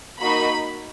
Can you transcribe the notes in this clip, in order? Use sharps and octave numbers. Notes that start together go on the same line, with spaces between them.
A#3 D#4 F#4 B5